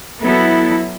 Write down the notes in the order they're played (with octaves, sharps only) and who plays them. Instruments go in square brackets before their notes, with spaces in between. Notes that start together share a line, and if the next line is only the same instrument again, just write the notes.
[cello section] F#3 B3 E4 A4